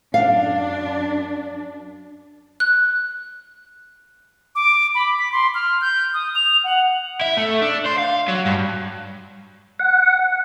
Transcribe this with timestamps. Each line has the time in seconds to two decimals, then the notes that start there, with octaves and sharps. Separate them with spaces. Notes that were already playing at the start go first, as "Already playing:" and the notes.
0.14 F#2 D4 F5
2.60 F#6
4.55 D6
4.95 B5
5.19 B6
5.32 C6
5.55 F6
5.81 G6
6.14 D#6
6.35 F7
6.64 F#5
7.21 E4
7.37 A3
7.62 D4
7.86 C5
7.99 F5
8.28 F#3
8.45 G2
9.79 F#5